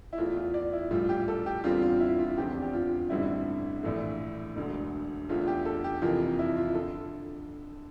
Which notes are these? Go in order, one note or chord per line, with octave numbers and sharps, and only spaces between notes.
E4
E2 E3 A3 F4
F4
D5
E4
A#1 A2 G3 F4
G4
A4
G4
E2 D3 G3 C4 F4
F4
E4
F4
F1 E2 D3 F3 C4 G4
G4
F4
A1 G2 D3 G3 C4 E4
A#1 A2 E3 A3
E1 D2 D3
E2 D3 A3 F4
G4
A4
G4
F2 C3 E3 A#3 F4
E4
F4
D3 A4